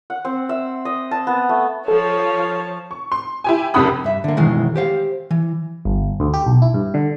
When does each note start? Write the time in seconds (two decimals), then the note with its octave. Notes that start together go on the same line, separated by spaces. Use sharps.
0.10 F#5
0.25 C4
0.49 E5
0.85 D#5
1.11 A5
1.27 B3
1.49 A3
1.88 F3 A4 C#5 A5
2.91 C#6
3.12 C6
3.44 E4 G4 G#5
3.74 F#1 F2 C3 F#5 B5 D#6
4.04 G2 E5
4.24 D3 A#3
4.37 F#2 B2 D#3 E3 G#3 A#3
4.76 G4 C5 F5
5.31 E3
5.85 G1
6.20 D2
6.34 G4
6.46 B1
6.62 E4
6.74 G2
6.94 D3